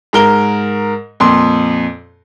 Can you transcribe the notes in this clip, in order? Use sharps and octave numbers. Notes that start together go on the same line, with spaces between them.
G#2 A#4 G7
F2 A#2 C6